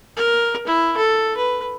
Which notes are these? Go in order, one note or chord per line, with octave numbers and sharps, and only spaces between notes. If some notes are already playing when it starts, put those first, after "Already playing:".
A#4
E4
A4
B4